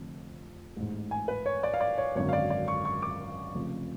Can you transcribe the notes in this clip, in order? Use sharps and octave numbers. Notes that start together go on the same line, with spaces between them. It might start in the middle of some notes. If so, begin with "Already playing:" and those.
Already playing: F1 F2 D3
A1 G#2
G#5
B4
C#5
D5
F5
D5
C#5
G#1 F#2 D3 C#5
F5
D5
D5
C#6
C#6
D6
F1 F2 C#3